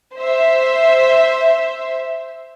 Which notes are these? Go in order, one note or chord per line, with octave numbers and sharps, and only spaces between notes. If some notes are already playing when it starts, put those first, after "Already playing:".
C5 E5